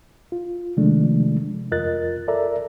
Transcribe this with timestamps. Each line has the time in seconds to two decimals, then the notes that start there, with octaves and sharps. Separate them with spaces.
0.32 F4
0.77 C3 D#3 F3 G#3 A3 D4
1.71 F2 F4 A#4 D#5 F#6 A6
2.28 A4 A#4 D5 E5 A#5